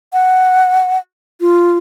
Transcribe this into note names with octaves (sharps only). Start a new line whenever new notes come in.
F#5
F4